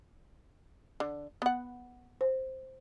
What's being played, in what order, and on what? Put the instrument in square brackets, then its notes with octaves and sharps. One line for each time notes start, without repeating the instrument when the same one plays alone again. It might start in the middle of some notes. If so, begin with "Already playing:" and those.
[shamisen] D3
B3 F#5
[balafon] C5